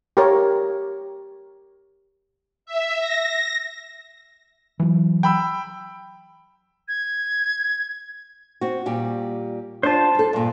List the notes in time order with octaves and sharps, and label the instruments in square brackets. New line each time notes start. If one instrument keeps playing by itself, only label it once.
[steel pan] G4 A#4 C#5
[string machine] E5
A#6
[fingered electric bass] E3 F#3
[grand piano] G5 B5 E6
[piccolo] G#6
[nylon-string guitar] C4 F#4
A#2 G3 G4
[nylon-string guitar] D4 F4 [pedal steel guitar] C5 A5
[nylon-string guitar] G3 A4
G2 A#2